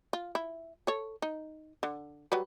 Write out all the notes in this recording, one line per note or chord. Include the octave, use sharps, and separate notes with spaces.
F4
E4
A4 C#5
D#4
D3
F#3 G3 B4